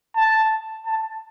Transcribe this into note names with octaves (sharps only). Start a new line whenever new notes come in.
A5
A5